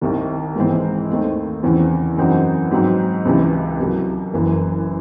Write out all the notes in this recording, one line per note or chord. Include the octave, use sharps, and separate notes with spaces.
C2 C3 D#3
G#2 E3 G#3 C4
D#2 D#3 A3 C4 D#4
E2 C#3 E3 C4
F#2 E3 C4 D#4 F#4
G#2 F#3 C4 D#4
C#2 C3 E3
C2 C3 F#3
F#1 F#2 E3